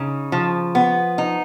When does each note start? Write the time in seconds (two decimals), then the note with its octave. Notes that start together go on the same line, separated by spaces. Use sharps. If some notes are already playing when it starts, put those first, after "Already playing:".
Already playing: C#3 D#4
0.32 F3
0.75 B3
1.18 D#4